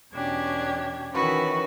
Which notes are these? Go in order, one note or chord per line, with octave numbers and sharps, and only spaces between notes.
E2 B2 C#4 D4 G4 G#6
D#3 E3 C#4 E4 F#4 B4